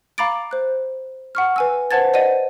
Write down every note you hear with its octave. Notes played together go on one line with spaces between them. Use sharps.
F5 A#5 B5 D6 A6 D7
C5 F#6
F#5 C#6 F6
B4 G#5 E6
B4 C5 F#5 A5 G#6 A6
C5 D5 D#5 F#5 D#7